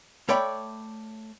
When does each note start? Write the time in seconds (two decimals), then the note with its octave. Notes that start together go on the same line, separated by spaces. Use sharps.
0.29 A3 C#5 D5 G5 B5